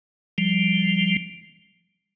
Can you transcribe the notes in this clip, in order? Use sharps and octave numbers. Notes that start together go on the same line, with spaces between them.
F3 G3